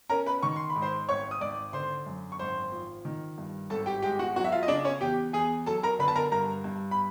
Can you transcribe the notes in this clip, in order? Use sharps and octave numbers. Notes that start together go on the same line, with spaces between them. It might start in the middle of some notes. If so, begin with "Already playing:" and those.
C#4 A#4 A#5
B4 B5
D#3 C#6
C6
B5
G#2
C5 C6
G#1 C#5 C#6
D#6
G#1 D5 D6
D3 C5 C6
F#2
C#6
G#1 C5 C6
F3
D#3
G2
G#1 A4 A5
G4 G5
G#3 G4 G5
F#4 F#5
F#3 F#4 F#5
E5
F4 F5
D#5
C#3 D4 D5
C#4 C#5
E2 G4 G5
E2 G#4 G#5
F#3 A4 A5
A#4 A#5
D3 B4 B5
A5
A#4 A#5
G2 A#4 A#5
G2
B5